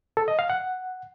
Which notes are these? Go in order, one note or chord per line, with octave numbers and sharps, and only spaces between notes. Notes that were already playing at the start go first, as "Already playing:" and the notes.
A4
D#5
F5
F#5